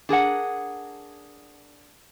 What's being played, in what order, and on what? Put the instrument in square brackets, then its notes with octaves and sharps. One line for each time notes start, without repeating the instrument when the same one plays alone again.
[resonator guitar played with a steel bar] D4 G#4 A#4 F#5